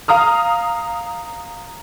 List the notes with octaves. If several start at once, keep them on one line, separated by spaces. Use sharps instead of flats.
F5 A#5 D#6 F6